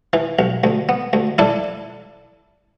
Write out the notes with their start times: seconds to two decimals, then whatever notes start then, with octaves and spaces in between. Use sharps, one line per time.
0.13 E3
0.39 B1
0.64 D2
0.89 B3
1.13 D2
1.38 D4 E4 A4